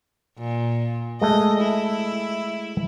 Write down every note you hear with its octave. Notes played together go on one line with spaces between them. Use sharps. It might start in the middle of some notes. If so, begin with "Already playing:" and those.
A#2
G#3 A3 A4 D#5
E4